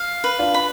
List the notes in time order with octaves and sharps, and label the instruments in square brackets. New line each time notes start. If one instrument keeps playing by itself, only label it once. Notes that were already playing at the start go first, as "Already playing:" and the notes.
Already playing: [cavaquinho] F5
B4
[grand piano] D4 F4
[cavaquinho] B5